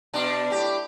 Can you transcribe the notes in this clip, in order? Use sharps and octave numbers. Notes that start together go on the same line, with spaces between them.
B2 D4
A2 G4